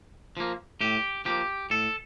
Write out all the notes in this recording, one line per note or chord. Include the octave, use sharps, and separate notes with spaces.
F3 A#3
A2 G4
F3 A#3 G4
A2 A4